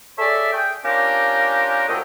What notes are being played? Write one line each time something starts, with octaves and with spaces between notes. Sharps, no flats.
G#4 A4 C#5 D5 E5
G#4 G5
A#3 C#4 D4 F4 G4 A#4
C2 A#2 F#3 A4 D#5 G5